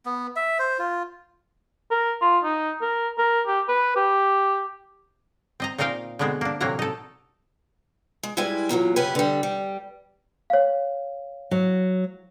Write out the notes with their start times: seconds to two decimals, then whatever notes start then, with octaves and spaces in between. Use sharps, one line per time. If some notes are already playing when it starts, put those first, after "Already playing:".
0.06 B3
0.36 E5
0.59 C5
0.79 F4
1.91 A#4
2.22 F4
2.44 D#4
2.81 A#4
3.18 A#4
3.47 G4
3.68 B4
3.96 G4
5.60 C4 D#5 A#5
5.78 A#2 C4 D#4 A#4 F5 G5
6.19 B2 D3 G#3 B3 C4
6.41 A#3 D4
6.60 A2 C3 E3 F#3 A#3 A#5
6.79 D#4 A4
8.23 G#3
8.37 G3 G#3 E4 B4 G#5
8.69 E2 A#2 D#3 F#3
8.96 F#2 C#3 C#4 G4 B4 G#5
9.15 D3 G3
9.43 G3
10.50 C#5 F5
11.51 F#3